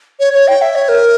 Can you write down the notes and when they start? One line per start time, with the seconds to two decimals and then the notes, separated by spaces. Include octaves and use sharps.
0.20 C#5
0.33 C#5
0.48 G5
0.62 E5
0.75 C#5
0.89 A#4